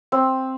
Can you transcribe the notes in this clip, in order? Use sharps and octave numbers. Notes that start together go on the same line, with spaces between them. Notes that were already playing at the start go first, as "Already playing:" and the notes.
C4